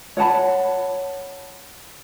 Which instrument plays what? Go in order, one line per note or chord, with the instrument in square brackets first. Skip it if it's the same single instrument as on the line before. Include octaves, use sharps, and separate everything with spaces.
[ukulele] C#5 F#5 A5 B5